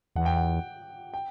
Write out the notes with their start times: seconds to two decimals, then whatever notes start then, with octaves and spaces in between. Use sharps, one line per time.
0.16 E2 F#5
0.26 G5
0.37 F#5
1.14 G5